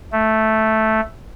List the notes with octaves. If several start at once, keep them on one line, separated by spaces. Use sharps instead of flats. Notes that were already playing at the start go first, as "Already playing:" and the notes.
A3